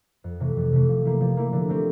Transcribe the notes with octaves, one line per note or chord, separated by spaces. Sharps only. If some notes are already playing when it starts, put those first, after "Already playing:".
F2
C3 E3 A3
F2
C3 E3 A3
F3
A#3 E4 G4
F3
A#3 E4 G4
D3
A3 C4 G4